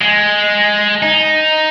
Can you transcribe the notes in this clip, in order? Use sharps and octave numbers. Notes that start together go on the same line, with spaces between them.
G#3
D#4